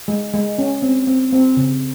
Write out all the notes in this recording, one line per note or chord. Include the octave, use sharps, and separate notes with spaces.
G#3
G#3
C#4
C4
C4
C4
C#3